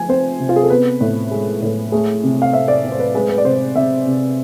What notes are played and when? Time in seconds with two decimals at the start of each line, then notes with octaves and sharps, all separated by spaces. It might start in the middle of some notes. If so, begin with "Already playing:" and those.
Already playing: F3 A3 G#5
0.09 C4 C5
0.40 C3
0.49 F4
0.56 G#4
0.63 A4
0.70 B3 B4
1.01 A2
1.31 G#3
1.62 A2
1.92 A3 G#4
2.23 C3
2.42 F5
2.53 C4 E5
2.68 D5
2.85 C4
2.92 C5
2.99 B4
3.15 G#3 B4
3.29 B4
3.38 D5
3.45 C3 C5
3.76 C3 E5
4.07 C3